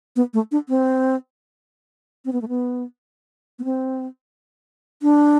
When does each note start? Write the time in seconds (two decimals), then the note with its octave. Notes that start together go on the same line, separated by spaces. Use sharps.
0.16 B3
0.34 A3
0.52 D4
0.69 C4
2.25 C4
2.33 B3
2.42 A3
2.49 B3
3.59 B3
3.64 C4
5.03 D4